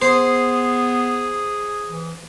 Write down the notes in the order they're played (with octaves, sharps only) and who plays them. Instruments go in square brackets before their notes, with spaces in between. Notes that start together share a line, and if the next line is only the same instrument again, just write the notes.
[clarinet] B3 [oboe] G#4 [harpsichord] C5
[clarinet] E3